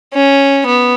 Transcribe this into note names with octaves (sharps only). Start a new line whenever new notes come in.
C#4
B3